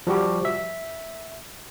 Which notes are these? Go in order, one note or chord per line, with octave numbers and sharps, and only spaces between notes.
F3 G3 F#4 G4
E5